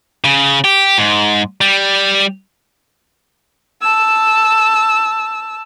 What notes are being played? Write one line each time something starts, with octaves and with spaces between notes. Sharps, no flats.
C#3
G4
G#2
G3
A5 E6